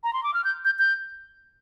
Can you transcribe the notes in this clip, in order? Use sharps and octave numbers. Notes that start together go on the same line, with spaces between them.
A#5
C6
D6
F6
G6
G6
G6